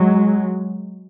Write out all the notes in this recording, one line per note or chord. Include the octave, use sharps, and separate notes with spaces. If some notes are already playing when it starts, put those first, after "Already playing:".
Already playing: F#3 G#3